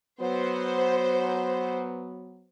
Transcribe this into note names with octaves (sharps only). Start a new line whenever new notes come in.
F#3 B3 C5